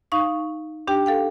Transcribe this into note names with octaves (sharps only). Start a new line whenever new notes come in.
D#4 F5 C#6
D4 G4 G5
A4 F5 G5